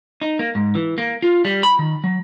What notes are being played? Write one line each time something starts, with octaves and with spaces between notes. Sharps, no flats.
D#4
A#3
G#2
E3
A#3
F4
G3
B5
D#3
F#3